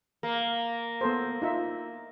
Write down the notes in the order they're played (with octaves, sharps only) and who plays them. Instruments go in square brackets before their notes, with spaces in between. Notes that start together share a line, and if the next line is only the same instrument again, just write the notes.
[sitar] A#3
[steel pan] B3 A4 C5
D#4 F4 E5